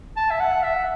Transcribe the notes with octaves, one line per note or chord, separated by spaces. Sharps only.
A5
E5
F#5
E5